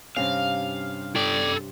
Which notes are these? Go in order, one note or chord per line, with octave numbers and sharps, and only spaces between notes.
G2 C3 C#4 F5
A4 D5 G5